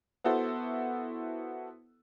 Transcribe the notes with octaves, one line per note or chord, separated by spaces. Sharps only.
B3 E4 F#4 A4 C5